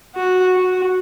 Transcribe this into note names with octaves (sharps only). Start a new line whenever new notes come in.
F#4
F#4